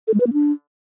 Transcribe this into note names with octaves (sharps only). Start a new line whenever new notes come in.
A4
G#3
B4
A#3
D4